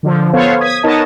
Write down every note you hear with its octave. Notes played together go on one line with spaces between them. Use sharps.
D3 F3
B3 A4 C5 C#5 F5
D#6 G#6 B6
B3 D#4 A#4 C#5 D#5 A5